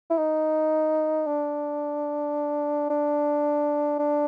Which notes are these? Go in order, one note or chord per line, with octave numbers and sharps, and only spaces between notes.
E4
D#4
D4
D4
D4